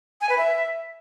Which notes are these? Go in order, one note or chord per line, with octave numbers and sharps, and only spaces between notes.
G#5
B4
E5